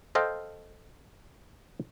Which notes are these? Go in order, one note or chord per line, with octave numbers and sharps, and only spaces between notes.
A4 C5 D#5 F5 G5